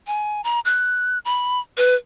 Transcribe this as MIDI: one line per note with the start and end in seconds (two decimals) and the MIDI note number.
0.07 0.44 80
0.44 0.60 82
0.65 1.19 90
1.25 1.60 83
1.77 1.95 71